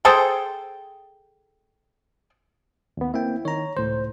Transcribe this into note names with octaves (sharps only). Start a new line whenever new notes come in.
G#4 A4 C5 G5
D#2 B3
A#3 C4 E4 G5
D#3 C#5 A#5
C#2 A2 C5